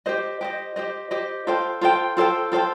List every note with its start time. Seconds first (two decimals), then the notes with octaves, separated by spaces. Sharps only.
0.06 G4 C5 D#5
0.41 G4 C5 D#5
0.76 G4 C5 D#5
1.11 G4 C5 D#5
1.47 F4 A4 C5 G5
1.81 F4 A4 C5 G5
2.17 F4 A4 C5 G5
2.52 F4 A4 C5 G5